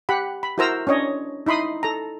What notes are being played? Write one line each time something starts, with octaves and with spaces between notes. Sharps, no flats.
G4 F#5 B5
B5
E4 F#4 A#4 C5 A#5 E6
C#4 D4 C#5 D#5
D#4 E4 B5 C6 D#6
A4 A#5